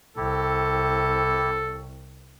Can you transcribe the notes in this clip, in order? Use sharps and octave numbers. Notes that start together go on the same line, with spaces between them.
C2 E4 G4 A4